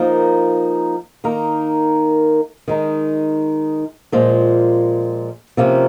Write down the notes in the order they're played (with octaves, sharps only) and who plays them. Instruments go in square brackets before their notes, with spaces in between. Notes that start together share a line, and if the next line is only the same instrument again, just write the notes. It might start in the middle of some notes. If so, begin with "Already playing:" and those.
Already playing: [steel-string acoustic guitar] F3 A#3 D#4 A#4
D#3 A#3 D#4 A#4
D#3 G#3 D#4
A#2 F3 G#3
C3 F3 A#3 C#4